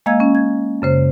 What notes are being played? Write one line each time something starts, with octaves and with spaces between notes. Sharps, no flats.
G#3 A#3 D#5 F5 E6 G#6
C#4
G#6
F#2 C#3 C5